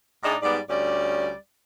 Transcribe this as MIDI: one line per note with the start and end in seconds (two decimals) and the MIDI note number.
0.23 0.36 45
0.23 0.36 62
0.23 0.36 63
0.23 0.36 68
0.23 0.36 74
0.43 0.58 44
0.43 0.58 55
0.43 0.58 59
0.43 0.58 74
0.69 1.31 38
0.69 1.31 55
0.69 1.31 61
0.69 1.31 74